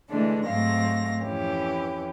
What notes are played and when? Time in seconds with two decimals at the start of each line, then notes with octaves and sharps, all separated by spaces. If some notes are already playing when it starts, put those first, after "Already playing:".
0.10 D3 E3 G#3 A3 D4
0.45 G#2 F#3 A3 C4 F5 A#6
1.23 F2 E3 C#4 G4